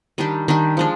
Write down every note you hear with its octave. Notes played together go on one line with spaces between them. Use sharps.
D#3 G3 D4 G4
D#3 G3 D4 G4
F3 G#3 D4